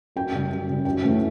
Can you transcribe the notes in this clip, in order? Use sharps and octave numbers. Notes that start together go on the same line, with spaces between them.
F#2 G5
C#3 G3
F#2
C#3 G3
F#2 G5
E3 A3 C#4